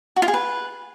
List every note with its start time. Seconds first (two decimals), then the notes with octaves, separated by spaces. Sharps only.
0.16 F#4
0.22 F4
0.28 G#4
0.34 B4